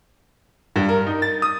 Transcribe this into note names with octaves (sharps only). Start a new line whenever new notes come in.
G2
A#4
D#4
A6
D#6